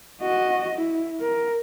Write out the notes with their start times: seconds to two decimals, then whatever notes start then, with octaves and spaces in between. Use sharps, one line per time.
0.22 F#4 D#5
0.75 E4
1.21 A#4